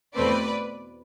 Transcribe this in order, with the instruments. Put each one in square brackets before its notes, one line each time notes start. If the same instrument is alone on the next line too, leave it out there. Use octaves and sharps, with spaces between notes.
[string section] E2 B2 A3 C4 B4 D5